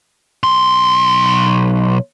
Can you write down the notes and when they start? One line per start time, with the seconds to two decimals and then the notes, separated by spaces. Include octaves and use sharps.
0.43 B1 C6